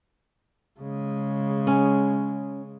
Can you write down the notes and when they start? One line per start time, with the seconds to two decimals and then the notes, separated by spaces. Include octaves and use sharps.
0.80 C#3 G#3
1.67 C#4